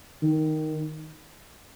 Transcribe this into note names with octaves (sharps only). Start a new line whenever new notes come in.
D#3